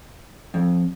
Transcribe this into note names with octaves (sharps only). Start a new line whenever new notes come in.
F2